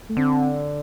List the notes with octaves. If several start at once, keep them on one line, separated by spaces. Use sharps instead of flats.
A3
D3 C4